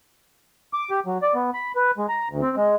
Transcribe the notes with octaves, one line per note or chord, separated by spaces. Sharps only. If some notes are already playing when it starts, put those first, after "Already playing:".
D6
G4
F#3
D5
B3
B5
B4
G#3
A#5
D2
C4
G#3